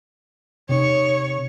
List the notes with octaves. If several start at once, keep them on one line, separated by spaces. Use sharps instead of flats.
C3 D#4 C#5